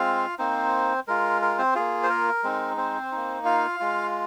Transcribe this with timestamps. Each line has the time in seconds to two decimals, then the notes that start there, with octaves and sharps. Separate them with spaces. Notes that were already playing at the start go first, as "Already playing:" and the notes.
Already playing: G#3 C4 F4 F5
0.39 A#3 C4 D#4 C5
1.08 G#3 F4 A#4
1.42 A#4
1.59 C4 C5
1.75 A#3 F4 G#4
2.03 C5
2.09 A#4
2.43 G#3 C4 D#4
2.77 C4 C5
3.12 A#3 D#4
3.45 F4 F5
3.80 G#3 F4